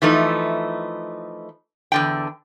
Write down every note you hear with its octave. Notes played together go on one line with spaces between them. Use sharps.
E3 F3 A3 D#4
E2 D3 G5